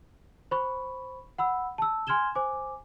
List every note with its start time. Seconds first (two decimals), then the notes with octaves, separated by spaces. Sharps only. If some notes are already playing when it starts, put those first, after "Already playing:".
0.51 C5 B5 C#6
1.38 F#5 B5 E6
1.78 A5 E6
2.07 G#5 C6 F6 G#6 E7 G7
2.35 C5 G#5 D6